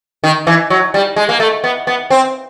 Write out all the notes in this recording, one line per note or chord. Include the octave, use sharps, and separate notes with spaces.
D#3
E3
F#3
G3
G#3
A#3
A3
B3
B3
C4